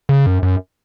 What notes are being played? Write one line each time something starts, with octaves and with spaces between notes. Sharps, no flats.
C#3
F#2
F#2